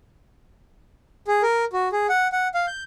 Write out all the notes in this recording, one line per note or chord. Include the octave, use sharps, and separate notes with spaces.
G#4
A#4
F#4
G#4
F#5
F#5
F5
G6